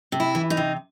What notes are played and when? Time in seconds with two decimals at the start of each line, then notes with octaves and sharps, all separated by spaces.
0.12 C3
0.20 E4
0.35 E3
0.50 D#4
0.57 C3